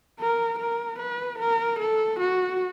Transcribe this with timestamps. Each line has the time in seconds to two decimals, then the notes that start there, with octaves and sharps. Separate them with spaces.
0.20 A#4
0.59 A#4
0.99 B4
1.39 A#4
1.79 A4
2.20 F#4